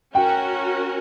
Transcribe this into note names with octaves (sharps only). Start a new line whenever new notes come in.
C#4 F#4 A#4 G5